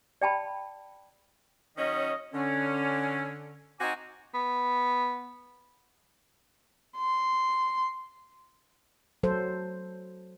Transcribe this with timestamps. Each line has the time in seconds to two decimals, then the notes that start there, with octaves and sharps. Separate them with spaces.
0.21 D5 G5 A5 B5
1.77 D#3 F#3 C#4 D#5
2.33 D3 C#4
3.80 C4 D#4 F#4 G#5 D6
4.34 B3
6.97 C6
9.23 F#3 A4 C5